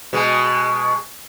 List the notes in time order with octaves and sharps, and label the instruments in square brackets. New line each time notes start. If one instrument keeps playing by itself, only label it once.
[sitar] B2 G#3